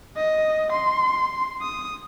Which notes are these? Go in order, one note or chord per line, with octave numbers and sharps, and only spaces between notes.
D#5
C6
D#6